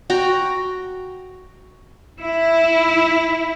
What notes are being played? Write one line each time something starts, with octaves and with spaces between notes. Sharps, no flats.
F#4 G5 A#5
E4